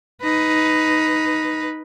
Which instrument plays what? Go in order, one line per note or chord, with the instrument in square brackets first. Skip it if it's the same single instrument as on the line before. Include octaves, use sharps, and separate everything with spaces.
[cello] D#4 B4